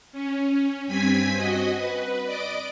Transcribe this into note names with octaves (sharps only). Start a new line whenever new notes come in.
C#4
G2 C4 G#5 G#6 B6
F#4 D#5
B4
D5 D#5 D6